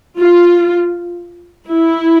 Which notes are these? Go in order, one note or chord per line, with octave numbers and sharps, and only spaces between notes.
F4
E4